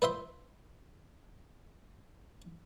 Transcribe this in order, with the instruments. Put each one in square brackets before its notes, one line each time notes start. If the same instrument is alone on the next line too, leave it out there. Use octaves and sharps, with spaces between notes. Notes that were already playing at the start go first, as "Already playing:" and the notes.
[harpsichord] B4 C5 E5 C6